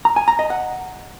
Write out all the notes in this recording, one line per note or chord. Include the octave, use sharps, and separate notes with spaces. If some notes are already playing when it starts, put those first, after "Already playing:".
A#5
G#5
A#5
D#5
F#5